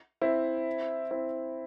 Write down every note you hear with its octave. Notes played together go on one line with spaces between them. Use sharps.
C4 E4
C4 E4